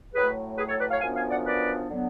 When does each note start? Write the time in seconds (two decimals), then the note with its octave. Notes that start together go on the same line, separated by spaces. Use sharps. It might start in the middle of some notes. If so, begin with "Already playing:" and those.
0.14 A2 F#3 A3 G#4 B4
0.57 G#4 B4
0.69 A4 C#5
0.80 B4 D5
0.90 C#5 F5
1.01 F#2 F3 B3 D4 F5 G#5
1.16 F5 G#5
1.30 D5 F#5
1.45 B4 D5
1.89 D3 F#3 B3 D4